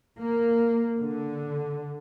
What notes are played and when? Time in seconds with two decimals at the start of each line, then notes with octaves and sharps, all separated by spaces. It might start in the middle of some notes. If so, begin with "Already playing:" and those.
0.18 A#3
0.99 D3